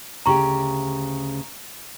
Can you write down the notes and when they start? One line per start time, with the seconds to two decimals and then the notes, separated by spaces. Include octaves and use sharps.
0.26 D2 C#3 G4 A#5 C#6